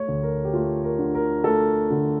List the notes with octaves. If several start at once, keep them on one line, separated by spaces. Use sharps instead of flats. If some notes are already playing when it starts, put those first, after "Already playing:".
Already playing: A3 C#5
D2
A#4
G4
A3 F4
A#4
D3
A#4
A3 A4
D3